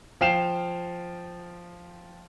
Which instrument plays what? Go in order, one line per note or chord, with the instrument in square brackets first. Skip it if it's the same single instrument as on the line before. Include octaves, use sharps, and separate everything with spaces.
[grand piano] F3 F5 G5 C7 E7 F7